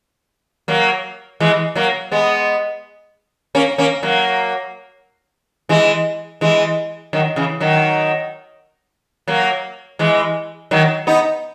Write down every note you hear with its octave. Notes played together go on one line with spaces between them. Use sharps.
F#3 A#3
E3 G#3
F#3 A#3
G#3 B3
A#3 C#4
A#3 C#4
F#3 A#3
E3 G#3
E3 G#3
D#3 F#3
C#3 E3
D#3 F#3
F#3 A#3
E3 G#3
D#3 F#3
B3 D#4